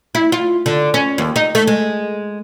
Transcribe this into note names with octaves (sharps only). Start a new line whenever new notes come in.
E4
F4
D3
C#4
D#2
D#4
A3
G#3